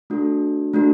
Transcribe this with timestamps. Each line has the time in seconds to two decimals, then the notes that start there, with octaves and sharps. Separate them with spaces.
0.10 A3 D4 F#4 A4
0.73 A3 D4 F#4 A4